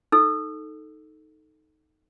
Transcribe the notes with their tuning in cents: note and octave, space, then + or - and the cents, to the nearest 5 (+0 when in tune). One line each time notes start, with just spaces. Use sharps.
D#4 +0 A4 +0 E6 +0